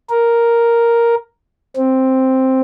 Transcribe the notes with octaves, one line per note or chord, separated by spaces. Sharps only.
A#4
C4